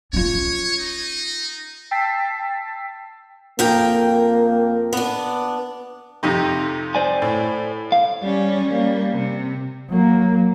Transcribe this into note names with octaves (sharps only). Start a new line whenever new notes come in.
C#4 F4 C#5
D#4
G5 A5 E6 A6 B6 C7
F2 A#3 A#4 G5
B3 D4
F2 C3 D#4
C5 D5 G#5
A2
F5
G3 C#4
G3 A#3
C3
F#3 A#3